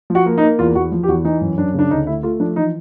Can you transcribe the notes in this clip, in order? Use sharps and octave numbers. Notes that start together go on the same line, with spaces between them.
F3
F#4
A#3
D#4
A#3
E2 F4
E2 F#4
F3
G4
E2 F#4
E3 D#4
F#2
F#2 D4
C#3 D4
D2 D#4
A3 E4
A3 F4
F3 D4
E3 D#4